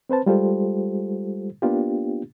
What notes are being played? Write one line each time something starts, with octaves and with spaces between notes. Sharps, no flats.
C4 B4 C5 A5
G3 G#3 F4 G4 A4 C5
A#3 B3 D4 F4 G4